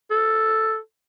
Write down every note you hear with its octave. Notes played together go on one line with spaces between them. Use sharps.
A4